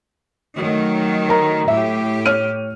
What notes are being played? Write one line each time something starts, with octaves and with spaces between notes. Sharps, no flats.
D#3 F#3 A3
A#4 A#5
A2 G4 E5
C#5 F6 D#7